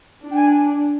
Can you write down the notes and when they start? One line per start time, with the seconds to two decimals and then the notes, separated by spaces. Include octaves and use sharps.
0.24 D4
0.30 G5
0.35 G#5